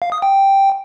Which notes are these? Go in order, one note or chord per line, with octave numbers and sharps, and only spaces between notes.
F5
D#6
G5